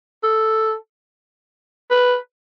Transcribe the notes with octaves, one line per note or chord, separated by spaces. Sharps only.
A4
B4